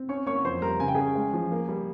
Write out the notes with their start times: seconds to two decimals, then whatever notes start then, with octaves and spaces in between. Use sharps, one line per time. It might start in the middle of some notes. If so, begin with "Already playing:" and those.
Already playing: C4
0.09 C#4 C#5 C#6
0.27 A#3 C#5 C#6
0.44 F2 C5 C6
0.62 G3 A#4 A#5
0.80 C#3 G#5
0.88 G5
0.95 C#4 G#4 G#5
1.15 G#3
1.33 F3
1.51 A#3
1.69 G3